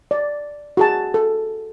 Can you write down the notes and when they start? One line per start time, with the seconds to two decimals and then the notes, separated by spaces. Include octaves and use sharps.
0.11 D5
0.77 F#4 G#4 A5
1.14 A4